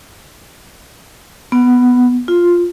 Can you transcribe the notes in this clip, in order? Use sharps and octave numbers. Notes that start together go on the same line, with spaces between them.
B3
F4